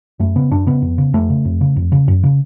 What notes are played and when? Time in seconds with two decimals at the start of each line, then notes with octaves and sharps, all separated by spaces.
0.19 F#2 A3
0.36 C#3 B3
0.51 F#2 D4
0.67 C#3 B3
0.82 F2
0.98 C#3
1.13 F2 A3
1.30 C#3
1.45 F2
1.61 C#3
1.76 F2
1.92 C#3
2.08 F#2
2.23 C#3